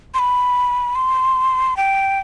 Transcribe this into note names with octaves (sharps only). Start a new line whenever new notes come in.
C6
B5
C6
G5